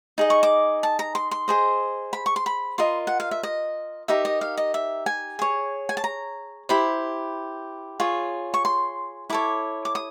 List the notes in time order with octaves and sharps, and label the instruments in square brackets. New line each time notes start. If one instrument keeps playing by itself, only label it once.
[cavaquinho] D#4 G#4 D#5
C#6
D6
A5
A#5
C6
C6
G#4 C5 D#5
B5
C#6
C6
B5
F4 A#4 D#5 C6
F#5
F5
E5
D#5
D#4 G4 A#4 E5
D#5
F5
D#5
E5
G#5
G#4 C#5
G#5
A5
A#5
E4 G4 C5 B5
F4 G#4 C#5
C#6
C6
E4 A4 C#5 D6
D6
D#6